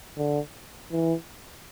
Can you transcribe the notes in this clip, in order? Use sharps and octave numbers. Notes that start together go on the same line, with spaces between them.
D3
E3